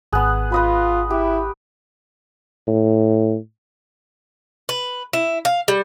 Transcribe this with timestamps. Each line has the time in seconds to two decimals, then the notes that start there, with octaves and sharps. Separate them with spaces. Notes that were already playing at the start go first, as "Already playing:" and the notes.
0.12 G#1 B3 G#4 F#6
0.52 F4 B4 D#5 B5
1.10 E4 G4
2.67 A2
4.69 B4
5.13 E4
5.45 F5
5.68 G3